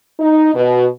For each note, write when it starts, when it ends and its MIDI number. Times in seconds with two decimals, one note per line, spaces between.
0.20 0.51 63
0.54 0.85 47